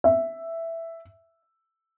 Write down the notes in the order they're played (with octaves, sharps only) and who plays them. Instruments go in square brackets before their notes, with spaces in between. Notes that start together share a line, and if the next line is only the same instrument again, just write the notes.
[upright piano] E5